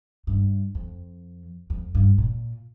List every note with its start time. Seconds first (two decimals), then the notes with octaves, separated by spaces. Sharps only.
0.27 G2
0.75 F2
1.70 F2
1.95 G2
2.18 A#2